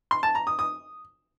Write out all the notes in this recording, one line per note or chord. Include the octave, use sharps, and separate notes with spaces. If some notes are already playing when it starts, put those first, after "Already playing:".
C6
A5
A#5
D#6
D#6